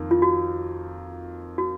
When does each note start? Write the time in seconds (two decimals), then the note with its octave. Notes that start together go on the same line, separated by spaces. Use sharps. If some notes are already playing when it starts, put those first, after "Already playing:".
Already playing: F2 D#3 A#3
0.11 F4
0.22 F#4
1.58 F#4